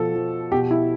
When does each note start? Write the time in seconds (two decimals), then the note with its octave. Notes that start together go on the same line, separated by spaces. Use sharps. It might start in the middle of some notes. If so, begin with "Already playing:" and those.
Already playing: B2 F3 A4
0.15 F3
0.52 B2 G4
0.71 E4